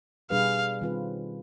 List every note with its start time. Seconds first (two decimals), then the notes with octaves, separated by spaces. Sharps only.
0.30 B2 G3 D4 G#4 B4 F5
0.81 D#3 G3 C4 F4 B4